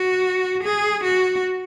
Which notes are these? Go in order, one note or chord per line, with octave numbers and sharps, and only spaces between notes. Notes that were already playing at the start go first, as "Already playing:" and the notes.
Already playing: F#4
G#4
F#4